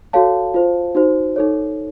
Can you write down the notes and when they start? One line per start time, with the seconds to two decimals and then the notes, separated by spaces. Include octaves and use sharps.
0.13 F#4 A4 C#5 F5 A5
0.54 F4 C5
0.95 D#4 F#4 C5
1.36 D#4 A4 C#5